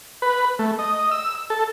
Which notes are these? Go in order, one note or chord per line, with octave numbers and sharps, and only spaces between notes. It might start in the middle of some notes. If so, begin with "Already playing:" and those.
B4
A3
D#5
E6
A4